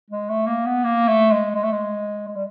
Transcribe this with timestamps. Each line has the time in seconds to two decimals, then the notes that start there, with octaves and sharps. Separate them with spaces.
0.11 G#3
0.30 A3
0.47 A#3
0.66 B3
0.84 A#3
1.08 A3
1.31 G#3
1.55 G#3
1.64 A3
1.72 G#3
2.27 G#3
2.36 G3